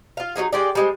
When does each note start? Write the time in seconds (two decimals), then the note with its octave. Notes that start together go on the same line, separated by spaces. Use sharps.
0.17 F4 F5
0.36 F#3 A#3 D#4 G#4
0.53 G#3 G4 D5
0.75 G3 G#3 C4